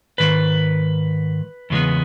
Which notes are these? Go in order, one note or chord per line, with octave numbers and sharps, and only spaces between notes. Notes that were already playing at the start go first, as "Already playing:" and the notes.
G#2 D#3 B4
E2 C#3 G#3 B3